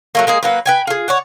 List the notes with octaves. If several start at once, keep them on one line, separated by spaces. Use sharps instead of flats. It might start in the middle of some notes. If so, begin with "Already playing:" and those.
F#3 A3 A#3
G#3 A#3 G#4
F#3 A#3 B4
B4 G5 G#5
F4 G#4
C#5 D5 F#5